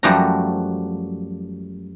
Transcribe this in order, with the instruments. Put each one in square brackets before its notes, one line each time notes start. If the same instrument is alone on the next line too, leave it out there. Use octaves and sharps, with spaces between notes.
[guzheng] F#2 F3 G3 A3 F#4 A#5